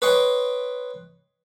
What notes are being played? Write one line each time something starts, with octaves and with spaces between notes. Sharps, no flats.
B4 C#5 D#5 G5 C6